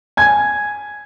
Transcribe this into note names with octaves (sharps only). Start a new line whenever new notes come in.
G#5 G#6